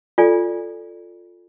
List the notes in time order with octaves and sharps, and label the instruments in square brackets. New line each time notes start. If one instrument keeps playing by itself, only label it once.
[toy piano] F4 A4 D5 G#5